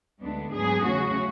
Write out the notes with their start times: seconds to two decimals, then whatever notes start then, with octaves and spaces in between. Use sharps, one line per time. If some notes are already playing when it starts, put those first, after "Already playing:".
0.22 D2 D3 G#3 B3 D4
0.53 G#2 F#3 B3 D4 G#4
0.83 E2 C#3 F#3 A3 C#4 F#4